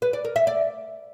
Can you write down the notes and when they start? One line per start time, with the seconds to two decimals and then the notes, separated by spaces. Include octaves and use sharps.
0.02 B4
0.13 D5
0.24 A#4
0.36 E5
0.47 D5